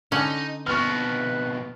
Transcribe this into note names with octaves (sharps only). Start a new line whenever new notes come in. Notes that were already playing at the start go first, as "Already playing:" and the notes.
D3 C#4 D#4 F#5
F2 B2 B4 C#6 F6